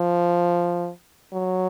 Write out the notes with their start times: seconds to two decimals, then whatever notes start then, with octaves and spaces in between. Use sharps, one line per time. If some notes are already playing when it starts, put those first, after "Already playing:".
Already playing: F3
1.33 F#3